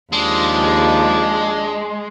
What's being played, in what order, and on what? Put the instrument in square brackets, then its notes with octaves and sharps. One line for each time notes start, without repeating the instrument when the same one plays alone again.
[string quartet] D#2 F3 [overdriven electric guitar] G#3 [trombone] D4